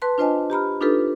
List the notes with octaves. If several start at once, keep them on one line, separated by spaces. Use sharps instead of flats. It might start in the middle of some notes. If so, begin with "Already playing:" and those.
B4 A5 C6 F#6
D4 F4 C5 D#5 G#5 A5
G4 A#5 B5 F6
D4 D#4 F4 G4 A4 B4